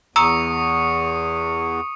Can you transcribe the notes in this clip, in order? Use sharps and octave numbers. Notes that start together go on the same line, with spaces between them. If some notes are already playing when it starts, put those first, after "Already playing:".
E2 A#5 C#6 D#6 E6 C#7